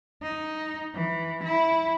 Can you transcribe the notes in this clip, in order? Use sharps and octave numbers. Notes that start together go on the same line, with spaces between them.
D#4
E3
E4